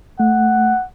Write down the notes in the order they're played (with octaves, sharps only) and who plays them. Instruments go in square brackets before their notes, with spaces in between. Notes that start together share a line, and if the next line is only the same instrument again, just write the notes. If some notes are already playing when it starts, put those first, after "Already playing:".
[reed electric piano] A3 [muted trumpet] F#5